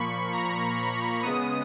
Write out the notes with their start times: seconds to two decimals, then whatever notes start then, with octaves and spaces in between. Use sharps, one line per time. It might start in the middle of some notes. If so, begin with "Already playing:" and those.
Already playing: A#2 F3 A#3 B5 C#6
0.33 A#5
0.78 B5
1.23 C#3 G#3 B3 D#6